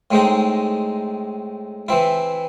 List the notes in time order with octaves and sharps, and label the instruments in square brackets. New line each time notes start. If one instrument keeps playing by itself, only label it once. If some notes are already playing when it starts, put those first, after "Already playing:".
[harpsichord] A2 G#3 C4 D#4
E3 C4 E4